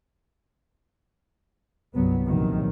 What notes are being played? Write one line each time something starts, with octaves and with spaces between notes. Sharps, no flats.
G1 C2 F#3 B3
A#1 C3 D#3 F#3